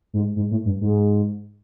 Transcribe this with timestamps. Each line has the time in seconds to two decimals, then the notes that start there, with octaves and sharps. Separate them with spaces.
0.13 G#2
0.36 G#2
0.51 A2
0.65 G2
0.81 G#2